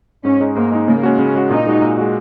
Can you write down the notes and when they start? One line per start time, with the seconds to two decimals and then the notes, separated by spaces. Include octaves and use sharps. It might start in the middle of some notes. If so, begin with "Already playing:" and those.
0.24 G#2 C#4
0.41 G#3 D#4
0.55 G#2 A#3
0.72 G#3 D#4
0.88 C#3 A#3
1.03 G#3 C#4 F#4
1.18 C#3 C#4
1.35 G#3 C#4 F#4
1.50 A#2 D#4
1.67 G#3 F#4
1.82 A#2
1.98 G#3 F#4